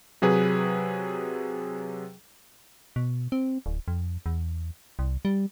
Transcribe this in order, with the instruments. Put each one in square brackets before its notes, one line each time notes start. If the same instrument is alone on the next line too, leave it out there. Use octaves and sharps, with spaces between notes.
[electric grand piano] C3 F#3 G#4 B4
[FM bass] B2
C4
D1
F2
E2
C2
G3